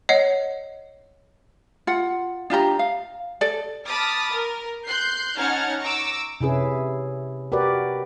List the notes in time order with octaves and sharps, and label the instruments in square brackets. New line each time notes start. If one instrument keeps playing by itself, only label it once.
[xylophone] C#5 D#5 F#5 C7
[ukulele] F4 F#5
D4 F4 G4 A#5
F5
A4 D5
[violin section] A5 B5 D6 D#6 F6 A6
A#4
C6 F#6 G6 C7
C#4 D#4 F#5 A5 F6 G#6
A#5 C#6 D6 E6
[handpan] C3 C#4 E4 G#4 B4
F#4 G4 A#4 B4 D5